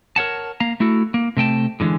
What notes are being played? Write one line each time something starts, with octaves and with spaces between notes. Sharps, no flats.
A#4 C#5 F#5 A5
A#3 F5 A#5
A3 E4 F#4 A4
A#3
C3 A3 G5 A5
A2 D3 E3 G#3